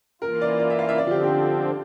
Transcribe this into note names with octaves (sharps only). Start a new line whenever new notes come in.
E3 A#3 F4 A#4
D5
D5
E5
F5
E5
D3 F3 C4 D5
F4
G4
G4